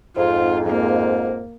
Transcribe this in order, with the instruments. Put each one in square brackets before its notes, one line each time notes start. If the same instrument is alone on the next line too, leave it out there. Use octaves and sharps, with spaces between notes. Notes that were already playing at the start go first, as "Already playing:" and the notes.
[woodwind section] F2 G#2 [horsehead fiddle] F4
[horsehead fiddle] A#3